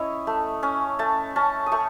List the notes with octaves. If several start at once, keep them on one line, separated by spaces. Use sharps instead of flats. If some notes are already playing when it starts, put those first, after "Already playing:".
Already playing: C#4 E4 C#5 D#5
A3
C#4
A3 A5
C#4 A5
D#6
A3 C#6